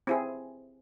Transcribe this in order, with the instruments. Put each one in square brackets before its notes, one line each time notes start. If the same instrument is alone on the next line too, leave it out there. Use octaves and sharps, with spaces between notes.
[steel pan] C4 E4 G#4